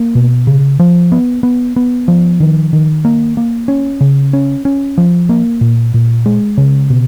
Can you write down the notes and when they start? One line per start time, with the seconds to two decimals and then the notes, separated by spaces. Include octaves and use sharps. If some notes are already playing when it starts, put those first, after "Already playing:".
Already playing: A#3
0.15 B2
0.47 C#3
0.79 F3
1.12 B3
1.43 B3
1.76 B3
2.08 F3
2.40 D#3
2.73 D#3
3.05 A#3
3.37 A#3
3.68 C#4
4.01 C#3
4.33 C#4
4.65 C#4
4.98 F3
5.29 A#3
5.61 A#2
5.94 A#2
6.26 G#3
6.57 C#3
6.90 B2